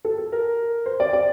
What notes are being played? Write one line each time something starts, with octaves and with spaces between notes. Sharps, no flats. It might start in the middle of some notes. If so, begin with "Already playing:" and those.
A4
A4
A#4
C5
D5
D5